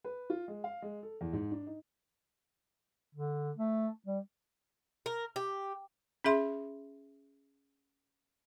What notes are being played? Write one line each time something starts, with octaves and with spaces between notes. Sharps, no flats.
B4
F4
G#3
F5
G#3
A4
E2
G#2
D4
D#4
D3
A3
G3
A#4
G4
C#4 G#4 E5 C6